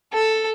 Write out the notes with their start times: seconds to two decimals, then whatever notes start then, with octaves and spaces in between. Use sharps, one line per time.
0.14 A4